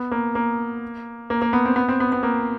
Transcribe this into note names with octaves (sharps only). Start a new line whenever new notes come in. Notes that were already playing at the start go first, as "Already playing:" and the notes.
Already playing: B3
A#3
A#3
A#3
A#3
B3
C4
B3
C4
B3
B3
A#3